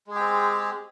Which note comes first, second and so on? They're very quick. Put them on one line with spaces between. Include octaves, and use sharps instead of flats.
G#3 G#4 G4 C4